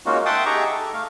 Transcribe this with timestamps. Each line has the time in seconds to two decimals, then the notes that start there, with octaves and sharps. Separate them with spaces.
0.06 G#3 A#3 C#4 D#4 F4 F#4
0.26 E5 F#5 G5 A5 C6 D#6
0.46 D#4 G4 G#4 E5 A#5 C#6
0.72 A4
0.94 A3 F5